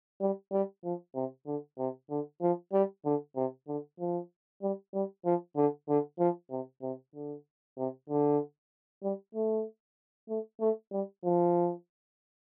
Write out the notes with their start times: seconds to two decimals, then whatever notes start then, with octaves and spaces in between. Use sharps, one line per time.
0.21 G3
0.52 G3
0.84 F3
1.15 C3
1.47 D3
1.78 C3
2.10 D3
2.42 F3
2.73 G3
3.05 D3
3.36 C3
3.68 D3
4.00 F3
4.62 G3
4.94 G3
5.25 F3
5.56 D3
5.88 D3
6.19 F3
6.51 C3
6.82 C3
7.15 D3
7.78 C3
8.09 D3
9.03 G3
9.35 A3
10.29 A3
10.60 A3
10.92 G3
11.24 F3